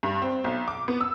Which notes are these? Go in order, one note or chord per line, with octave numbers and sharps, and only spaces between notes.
G2
C4
B1
D6
B3
E6